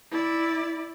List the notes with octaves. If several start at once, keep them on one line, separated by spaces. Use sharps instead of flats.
E4 D5